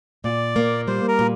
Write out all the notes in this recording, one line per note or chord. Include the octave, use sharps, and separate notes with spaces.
A#2 D5
A#3
G3 C5
A#4
A#2